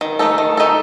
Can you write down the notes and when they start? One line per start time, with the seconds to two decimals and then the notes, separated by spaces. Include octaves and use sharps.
0.01 D#3
0.19 A3 D#4 A4
0.38 D#3
0.57 A3 D#4 A4